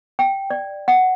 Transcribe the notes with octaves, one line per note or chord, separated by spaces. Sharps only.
G5
D5
F#5